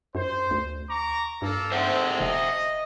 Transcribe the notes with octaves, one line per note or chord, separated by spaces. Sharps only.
F#2 C5
D2
A#5 C#6 D6
G2 A#3 A4
G#3 C4 C5 E5 F#5
E1 D#5